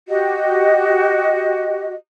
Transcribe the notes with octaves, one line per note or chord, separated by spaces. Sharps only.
F#4 G4 D#5